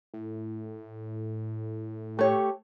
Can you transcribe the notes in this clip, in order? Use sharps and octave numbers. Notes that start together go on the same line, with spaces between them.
A2
A3 G4 C#5